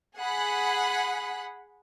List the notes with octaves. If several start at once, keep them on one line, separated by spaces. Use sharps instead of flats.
G#4 F#5 B5